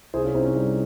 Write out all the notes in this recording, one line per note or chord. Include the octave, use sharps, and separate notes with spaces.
C2 G#4 C5
C#4 F4
C2 C4 D#4
C#4
G3